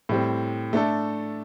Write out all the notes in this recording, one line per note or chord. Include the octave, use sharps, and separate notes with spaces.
A2 G3 C4
A3 D4 A4